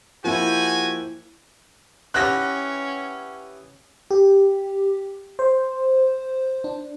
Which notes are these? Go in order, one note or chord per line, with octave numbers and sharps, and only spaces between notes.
F3 A#3 E4 F#4 G4 G#5
B3 C#4 E4 G4 F#6 A#6
G4
C5
D4